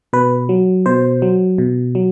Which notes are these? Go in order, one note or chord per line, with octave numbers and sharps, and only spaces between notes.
B2 B4
F#3
B2 C5
F#3
B2
F#3